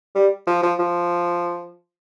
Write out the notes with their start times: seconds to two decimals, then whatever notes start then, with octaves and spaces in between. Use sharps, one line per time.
0.15 G3
0.47 F3
0.63 F3
0.79 F3